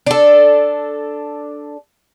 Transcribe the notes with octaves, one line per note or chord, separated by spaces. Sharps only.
D4 A4